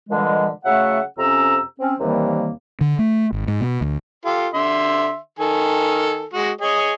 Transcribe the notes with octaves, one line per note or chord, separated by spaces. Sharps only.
A#2 D3 E3 G3 G#3
C#3 F#3 A3 E5 F#5
F2 C3 C#4 A#5 E6
C4 C#4
D#2 C3 D#3 E3 G3 A#3
D3
A3
G#1
G#2
B2
D2
F4 G4 A4
D3 E5 C6
D#3 A4 G#5
G#3 F#4
G#4 C#5 D#5